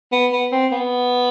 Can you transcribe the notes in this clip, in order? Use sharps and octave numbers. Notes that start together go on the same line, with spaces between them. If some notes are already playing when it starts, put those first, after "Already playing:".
B3
B3
C4
B3